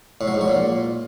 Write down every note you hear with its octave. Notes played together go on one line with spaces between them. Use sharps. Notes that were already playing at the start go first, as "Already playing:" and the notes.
A2
F#3
G#2
F#3
A#2